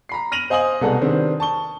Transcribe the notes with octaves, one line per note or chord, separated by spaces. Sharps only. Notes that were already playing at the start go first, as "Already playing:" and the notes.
A#5 B5 C7
F6 A#6 D#7 F7 F#7
C5 D#5 F5 G#5 D#6 F#7
C2 B2 G#3 B3 A4 F#5
C3 D#3 C4 D4 B4
A5 C#6 G7